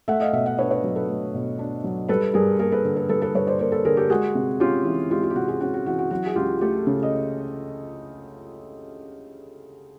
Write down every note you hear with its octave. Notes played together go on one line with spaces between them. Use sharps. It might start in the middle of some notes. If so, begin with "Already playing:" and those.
A3 E5 F#5
D#5 F5
B2 E5 F#5
E5 F#5
D4 B4 C#5
B4 C#5
F#3
A4 B4
A3
B2
D4
F#3
G3 A4 B4
G2 G#4 A#4
A#3 G#4 A#4
A4 B4
D3
A4 B4
G3 A4 B4
A4 B4
G2 B4 C#5
C5 D5
A#3 A#4 C5
A4 B4
D3 G#4 A#4
G4 A4
G#3 F#4 G#4
C3
C#4 F4 G4
E3
G#3 F4 G4
F4
G4
C3 F#4
F#4 G#4
C#4 F#4
F#4
E3 F#4
F#4
F#3 F#4
G#4
C#2 F4 G4
A3 G4 A4
C#3
D#5